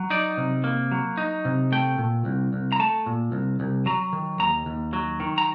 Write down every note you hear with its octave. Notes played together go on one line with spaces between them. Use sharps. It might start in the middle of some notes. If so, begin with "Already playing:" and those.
Already playing: F#3
D#4 D5
C3
A#3
F#3
D#4
C3
A3 G5
A#2
C2
C2
A#5
A3 A5
A#2
C2
C2
F#3 A#5
D#3
D#2 A#5
D#2
F#3
D#3
A#5